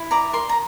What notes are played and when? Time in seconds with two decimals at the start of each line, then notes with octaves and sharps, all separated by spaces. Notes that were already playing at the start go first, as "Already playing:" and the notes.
Already playing: E4
0.11 D5 A#5
0.33 A#4 C6
0.49 A#5